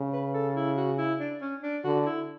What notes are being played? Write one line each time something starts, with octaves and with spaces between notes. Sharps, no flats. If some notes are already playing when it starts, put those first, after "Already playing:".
Already playing: C#3
B4
A4
E4
F#4
E4
D4
C#4
D4
D3 F#4
E4